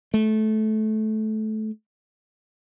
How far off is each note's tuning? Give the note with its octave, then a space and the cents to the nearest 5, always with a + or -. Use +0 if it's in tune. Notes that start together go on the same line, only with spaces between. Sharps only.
A3 -20